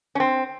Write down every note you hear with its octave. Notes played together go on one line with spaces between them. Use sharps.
C#4
C4